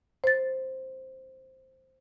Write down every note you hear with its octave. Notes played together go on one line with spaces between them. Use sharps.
C5 A6